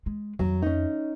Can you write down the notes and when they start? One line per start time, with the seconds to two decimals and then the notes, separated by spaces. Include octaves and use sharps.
0.06 G#3
0.39 F2 D#3 F#3
0.62 C#4 D#4